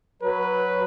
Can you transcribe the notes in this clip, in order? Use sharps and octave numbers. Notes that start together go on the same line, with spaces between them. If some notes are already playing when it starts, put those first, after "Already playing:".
F#3 B4